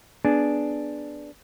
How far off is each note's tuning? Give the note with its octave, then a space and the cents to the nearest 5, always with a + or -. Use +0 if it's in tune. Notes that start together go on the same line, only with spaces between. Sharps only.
B3 +0 D4 +0 G#4 +10